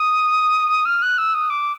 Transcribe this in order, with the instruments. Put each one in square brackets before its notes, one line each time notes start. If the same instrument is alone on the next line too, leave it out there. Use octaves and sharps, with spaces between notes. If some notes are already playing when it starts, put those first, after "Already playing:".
Already playing: [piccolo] D#6
F6
F#6
E6
D#6
D6